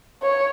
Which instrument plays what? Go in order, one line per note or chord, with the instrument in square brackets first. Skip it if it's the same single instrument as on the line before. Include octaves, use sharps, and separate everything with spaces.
[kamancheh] C#5